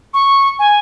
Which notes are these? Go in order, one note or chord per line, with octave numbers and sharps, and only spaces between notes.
C#6
G#5